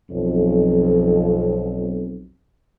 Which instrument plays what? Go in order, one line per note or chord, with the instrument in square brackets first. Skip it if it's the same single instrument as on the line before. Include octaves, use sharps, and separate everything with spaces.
[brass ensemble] B1 F2